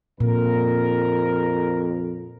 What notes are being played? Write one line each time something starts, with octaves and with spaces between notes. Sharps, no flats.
F2 A#2 A#4